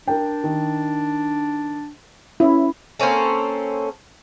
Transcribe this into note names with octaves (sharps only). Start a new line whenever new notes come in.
D4 A#4 G5
D#3
C#4 E4
A#3 C4 C#4 A4